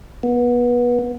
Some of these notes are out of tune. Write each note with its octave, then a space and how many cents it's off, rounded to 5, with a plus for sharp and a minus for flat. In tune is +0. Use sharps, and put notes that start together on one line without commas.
B3 -25